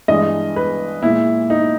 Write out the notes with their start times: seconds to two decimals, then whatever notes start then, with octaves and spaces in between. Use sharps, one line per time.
0.08 G2 E3 G#3 D#5
0.56 B4
1.02 A#2 G#3 E4
1.50 D#4